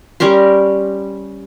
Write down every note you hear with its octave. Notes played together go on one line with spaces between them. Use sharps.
G3 C#4 A#4 C6